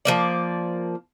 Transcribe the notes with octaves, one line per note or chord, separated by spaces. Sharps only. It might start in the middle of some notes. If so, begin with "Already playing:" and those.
F3 A#3 D5